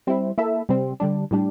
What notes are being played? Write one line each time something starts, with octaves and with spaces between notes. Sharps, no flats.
G3 C4 E4
A#3 E4 A4 E5
C3 G3 C4
D3 G3 D4
A2 G3 D4